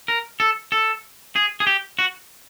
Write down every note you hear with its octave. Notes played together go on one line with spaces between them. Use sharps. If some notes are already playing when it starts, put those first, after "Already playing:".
A#4
A4
A4
G#4
G#4
G4
F#4